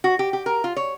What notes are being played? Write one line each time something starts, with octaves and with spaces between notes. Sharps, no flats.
F#4
G4
G4
A#4
F4
C#5